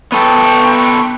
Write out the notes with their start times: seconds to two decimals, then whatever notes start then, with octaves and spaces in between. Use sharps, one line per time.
0.12 B3 A4 G5 C6 C#6